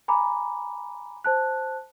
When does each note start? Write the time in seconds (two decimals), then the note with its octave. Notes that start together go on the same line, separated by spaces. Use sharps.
0.08 G#5 A#5 B5 D6
1.24 C5 A5 F#6